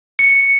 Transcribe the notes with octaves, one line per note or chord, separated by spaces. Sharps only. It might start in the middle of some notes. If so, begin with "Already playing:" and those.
C#7